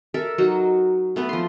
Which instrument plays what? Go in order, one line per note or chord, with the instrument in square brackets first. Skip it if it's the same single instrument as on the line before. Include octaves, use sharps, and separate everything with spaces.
[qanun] A4 A#4 E5
F#3 D#4 F#4
A3 B3 B4
F3 C6